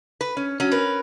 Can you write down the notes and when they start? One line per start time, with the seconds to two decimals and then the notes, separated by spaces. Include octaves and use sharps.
0.21 B4
0.37 C#4
0.60 F#3 C#4
0.72 A#4 B4